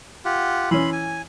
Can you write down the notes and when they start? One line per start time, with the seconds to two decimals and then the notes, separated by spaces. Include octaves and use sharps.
0.25 F4 G4 F#5
0.71 E3 C#4 B5 C6
0.92 G#5